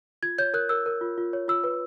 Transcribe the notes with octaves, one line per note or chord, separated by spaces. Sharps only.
F4 G#6
C#5 G6
A#4 F#6
A#4 E6
A#4
F4
F4
C#5
F4 E6
B4